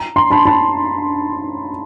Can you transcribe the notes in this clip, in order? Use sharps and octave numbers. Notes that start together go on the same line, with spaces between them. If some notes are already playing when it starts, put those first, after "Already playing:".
Already playing: A#5
A#5 C6
A5 B5
A5 B5